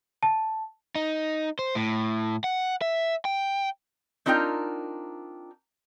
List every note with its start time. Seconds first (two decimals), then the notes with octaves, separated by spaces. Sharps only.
0.23 A5
0.95 D#4
1.59 C5
1.75 A2
2.44 F#5
2.82 E5
3.25 G5
4.26 C4 D4 D#4 F4 A#4 G5